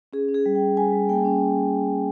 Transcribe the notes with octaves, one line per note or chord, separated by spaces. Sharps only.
C#4 G#4
C#4
G#4
G3
G5
C#4
G3 G#5
G3
A#3 G5
C#4